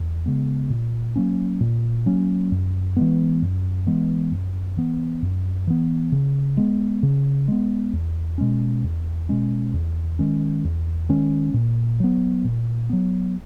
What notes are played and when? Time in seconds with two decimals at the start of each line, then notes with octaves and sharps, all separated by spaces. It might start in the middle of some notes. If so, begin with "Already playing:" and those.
Already playing: E2
0.26 C#3 G#3 B3
0.70 A#2
1.16 F#3 A#3 C#4
1.61 A#2
2.06 F#3 A#3 C#4
2.52 F#2
2.96 E3 G#3 B3
3.42 F#2
3.87 E3 G#3 B3
4.32 F#2
4.77 E3 B3
5.22 F#2
5.67 E3 B3
6.12 C#3
6.57 G#3 B3
7.03 C#3
7.48 G#3 B3
7.93 E2
8.38 B2 G#3 C#4
8.84 E2
9.29 B2 G#3 C#4
9.74 E2
10.19 D#3 G#3 C#4
10.65 E2
11.09 D#3 G#3 C#4
11.54 A#2
12.00 F#3 B3
12.44 A#2
12.90 F#3 B3